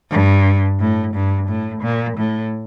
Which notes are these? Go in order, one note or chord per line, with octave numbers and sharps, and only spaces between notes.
G2
A2
G2
A2
A#2
A2